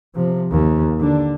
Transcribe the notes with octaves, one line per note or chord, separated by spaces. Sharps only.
C3 F3
D#2
D3 D4